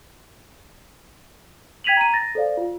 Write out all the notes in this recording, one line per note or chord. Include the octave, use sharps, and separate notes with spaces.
G5 G#6 B6 D#7 F7 F#7
A#5 D#7
A6 A#6
A4 C5 D5 F5
F4